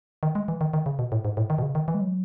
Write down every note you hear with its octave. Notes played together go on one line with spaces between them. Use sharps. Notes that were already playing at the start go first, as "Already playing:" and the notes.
D#3
G#3
E3
D#3
D#3
C#3
B2
A2
G#2
A2
D#3
B2
C#3
D#3
E3
G#3
F#3